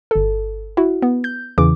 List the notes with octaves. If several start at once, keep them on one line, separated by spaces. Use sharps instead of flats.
G1 A4
E4 F#4
B3
G6
E2 C#3 E3 D6